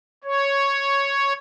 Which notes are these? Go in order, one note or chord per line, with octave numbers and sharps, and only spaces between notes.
C#5